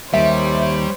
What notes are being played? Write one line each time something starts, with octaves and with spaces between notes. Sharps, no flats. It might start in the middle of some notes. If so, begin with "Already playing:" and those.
D#2 D#3 G3 C5 C#5 E5